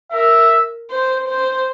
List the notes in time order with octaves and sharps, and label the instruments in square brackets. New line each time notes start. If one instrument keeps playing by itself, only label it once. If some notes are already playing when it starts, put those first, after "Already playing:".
[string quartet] A#4 [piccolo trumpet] E5
[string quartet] C5
C5